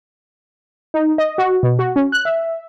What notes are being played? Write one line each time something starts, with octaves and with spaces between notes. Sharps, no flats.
D#4
D#5
F#4
B2
F#4
C#4
F#6
E5